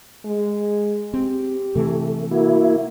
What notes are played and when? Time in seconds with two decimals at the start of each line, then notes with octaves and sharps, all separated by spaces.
0.25 G#3
1.14 C4 G4
1.75 C3 E3 A3
2.31 A#3 E4 F#4